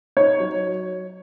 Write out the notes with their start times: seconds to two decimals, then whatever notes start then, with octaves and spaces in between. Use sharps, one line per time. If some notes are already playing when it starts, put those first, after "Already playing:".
0.17 D#4 C#5
0.40 F#3